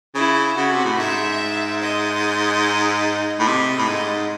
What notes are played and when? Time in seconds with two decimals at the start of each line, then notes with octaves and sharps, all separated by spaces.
0.14 C#3 E4
0.57 C#3 F#4
0.72 C3
0.85 A2
0.98 G#2 E5
1.81 D#5
3.39 A2
3.47 C3 D#5
3.78 A2
3.88 G#2